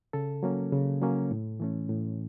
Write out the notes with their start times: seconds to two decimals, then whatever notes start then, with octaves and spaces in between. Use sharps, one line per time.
0.13 C#3 A4
0.43 F#3 A#3 C#4
0.72 C#3
1.02 F#3 A#3 C#4
1.31 A2
1.60 E3 A3 C#4
1.89 A2